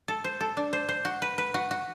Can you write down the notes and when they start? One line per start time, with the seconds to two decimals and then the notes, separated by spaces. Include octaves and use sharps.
0.08 A4
0.24 C5
0.41 A4
0.57 D4
0.73 C5
0.89 C5
1.05 F#4
1.22 B4
1.38 B4
1.54 F#4
1.71 F#4